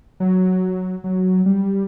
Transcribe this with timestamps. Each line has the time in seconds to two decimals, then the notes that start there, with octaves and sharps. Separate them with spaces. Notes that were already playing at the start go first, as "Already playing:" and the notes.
0.20 F#3
1.04 F#3
1.46 G3